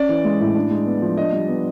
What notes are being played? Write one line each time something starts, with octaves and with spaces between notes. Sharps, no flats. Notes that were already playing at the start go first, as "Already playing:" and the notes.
Already playing: C#4 D5
E3
G#3
A2
D4
G#3
B3
F3
D4 D#5
G3
B3